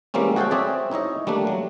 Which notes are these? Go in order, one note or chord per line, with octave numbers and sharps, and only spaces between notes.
E3 G3 G#3 A#3 C4 C#4
F#4 G#4 A4 C#5 F5 G5
C4 F#4 G#4 C#5 D5 E5
D#4 E4 C#5 D#5
G3 A3 A#3 D4
F#3